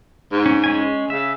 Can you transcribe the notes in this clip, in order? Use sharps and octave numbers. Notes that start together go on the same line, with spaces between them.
G#2
C#4
G#3 C#4 G#5
C#3 E5